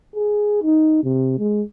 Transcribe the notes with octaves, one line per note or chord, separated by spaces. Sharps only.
G#4
D#4
C3
G#3